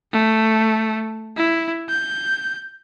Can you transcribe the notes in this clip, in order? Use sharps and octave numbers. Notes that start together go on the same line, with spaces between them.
A3
E4
G6